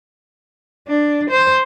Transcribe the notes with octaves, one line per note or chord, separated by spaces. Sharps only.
D4
C5